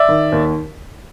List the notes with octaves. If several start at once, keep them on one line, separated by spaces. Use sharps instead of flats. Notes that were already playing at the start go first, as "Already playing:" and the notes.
Already playing: D5 E5
D#3
D#2